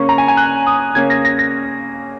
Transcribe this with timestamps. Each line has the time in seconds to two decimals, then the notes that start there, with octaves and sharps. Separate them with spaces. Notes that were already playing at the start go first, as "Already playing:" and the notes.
Already playing: C#3 A#3 C#4 C#6
0.09 A#5
0.18 G#5
0.28 G#5
0.37 F#6
0.67 D#6
0.95 C#3 A#3 C#4 G#6
1.10 A#6
1.25 A#6
1.39 A#6